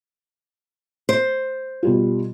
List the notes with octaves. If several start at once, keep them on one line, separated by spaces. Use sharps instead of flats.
C5
B2 G3 F4